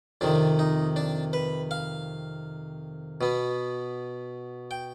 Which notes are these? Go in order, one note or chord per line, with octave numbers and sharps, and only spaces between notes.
F2 C3 D#3 D4
D#4
D4
B4
F5
B2 B3
G5